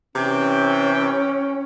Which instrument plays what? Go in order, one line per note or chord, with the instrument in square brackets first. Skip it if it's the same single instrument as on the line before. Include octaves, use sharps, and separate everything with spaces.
[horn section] C3 E3 G5 [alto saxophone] C#4